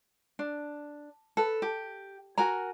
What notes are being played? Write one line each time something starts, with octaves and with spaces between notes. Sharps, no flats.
D4
A4 B4
G4
F#4 A#4 G#5 A#5